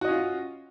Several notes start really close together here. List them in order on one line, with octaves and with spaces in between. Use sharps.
F#4 D#5 C#4 F4